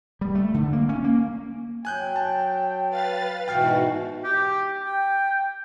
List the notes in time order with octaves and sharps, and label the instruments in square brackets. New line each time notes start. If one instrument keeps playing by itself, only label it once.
[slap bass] G3
A3
D3
A#3
C#4
A#3
[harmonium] F#3 [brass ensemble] G5 [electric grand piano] G#5 F#6 G6
[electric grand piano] A5
[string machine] B4 F5 A6
[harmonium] G#2 B2 E3 [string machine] F#4 [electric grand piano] G5 F6 C7
[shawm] G4
G5